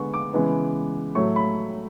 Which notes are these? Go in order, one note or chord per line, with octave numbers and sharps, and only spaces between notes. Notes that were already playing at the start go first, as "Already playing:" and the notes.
Already playing: D3 G#3 B3 C#6
D6
C#3 E3 G#3 B3
A2 F#3 A3 C#6
B5